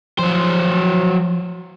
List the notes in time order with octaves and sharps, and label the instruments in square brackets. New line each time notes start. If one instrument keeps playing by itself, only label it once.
[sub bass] F3 [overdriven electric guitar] F#3 C5